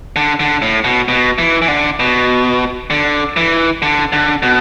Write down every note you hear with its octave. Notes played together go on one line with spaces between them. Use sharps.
D3
D3
A2
B2
B2
E3
E3
D3
B2
D3
E3
D3
D3
B2